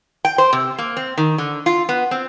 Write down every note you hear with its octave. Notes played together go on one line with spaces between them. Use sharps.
G5
C5
C3
A#3
C4
D#3
D3
F4
B3
C4